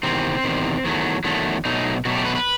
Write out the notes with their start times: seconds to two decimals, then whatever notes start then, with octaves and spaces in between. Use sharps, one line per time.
0.03 E2 C3 D#3 C4
0.44 E2 C3 D#3
0.85 E2 D#3 F#3 A3
1.24 E2 D#3 F#3 A3
1.65 B2 F#3 A3 D#4
2.05 B2 F#3 A3 F#4
2.15 G4
2.25 B4
2.35 B4